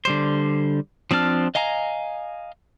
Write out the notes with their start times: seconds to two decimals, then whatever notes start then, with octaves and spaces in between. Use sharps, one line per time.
0.05 D3 G3 C5
1.11 F3 C4 D4 A5 F6
1.55 D#5 F5 G#5 A#5